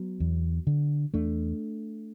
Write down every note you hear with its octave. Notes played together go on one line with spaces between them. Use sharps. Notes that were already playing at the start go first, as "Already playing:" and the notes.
Already playing: F#3 B3
E2
D3
E2 A3 D4